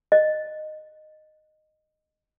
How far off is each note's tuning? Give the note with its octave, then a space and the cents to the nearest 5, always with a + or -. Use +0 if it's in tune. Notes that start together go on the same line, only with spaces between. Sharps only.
D#5 -10